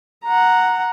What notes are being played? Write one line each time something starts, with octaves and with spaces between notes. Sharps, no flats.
F#5 A#5